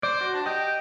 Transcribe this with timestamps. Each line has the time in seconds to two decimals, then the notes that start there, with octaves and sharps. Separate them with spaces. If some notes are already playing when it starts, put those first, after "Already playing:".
0.03 C5 D5
0.21 F#4
0.34 D4
0.46 G4 D#5 G5